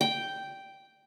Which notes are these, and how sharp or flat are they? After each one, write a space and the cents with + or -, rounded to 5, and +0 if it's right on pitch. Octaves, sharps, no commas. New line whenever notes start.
G5 -5